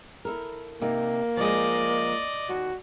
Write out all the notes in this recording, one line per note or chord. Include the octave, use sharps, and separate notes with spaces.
E4 A4 A#4
C3 A#3 D#4
F3 G#3 D5 D#5
D#2 F#4